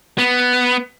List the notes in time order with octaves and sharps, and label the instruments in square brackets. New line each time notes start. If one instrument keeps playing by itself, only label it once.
[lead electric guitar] B3